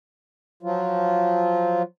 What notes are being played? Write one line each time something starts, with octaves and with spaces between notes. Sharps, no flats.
F3 F#3 F4